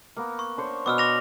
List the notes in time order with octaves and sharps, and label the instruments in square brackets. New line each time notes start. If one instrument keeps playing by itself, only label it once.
[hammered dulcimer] A#3 B3
[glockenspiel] C#6
[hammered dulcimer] D4 C5 C#5
[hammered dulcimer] B2 B3 [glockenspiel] D6 E6 F6
[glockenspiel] D6 A#6 F7